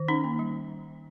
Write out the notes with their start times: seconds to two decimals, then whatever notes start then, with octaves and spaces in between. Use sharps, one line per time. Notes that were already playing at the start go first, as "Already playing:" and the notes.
Already playing: D#3
0.08 C#4 D#4
0.24 A#3
0.39 G3